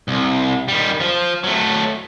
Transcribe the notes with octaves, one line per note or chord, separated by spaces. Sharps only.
C2
D#3 G3
F3
F#3 A3